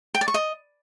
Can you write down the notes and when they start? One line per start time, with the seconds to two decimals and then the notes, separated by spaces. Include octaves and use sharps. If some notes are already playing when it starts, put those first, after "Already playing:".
0.15 G5
0.21 D5
0.28 C#6
0.34 D#5